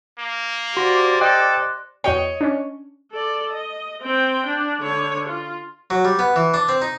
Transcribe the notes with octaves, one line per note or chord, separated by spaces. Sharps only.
A#3
F#4 G4 C5 D5 C6 A#6
A4 D#5 G5 D6 F#6
E2 F#4 C#5 D#5 G5
C#4 D4
A4 D5
D#5
C4 G5
D4
D3 C#5
F4
F#3
G3
B3
E3
D4
C4
D#4